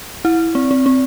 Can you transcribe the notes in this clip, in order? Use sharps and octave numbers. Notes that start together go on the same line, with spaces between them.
E4
C4
C4
C4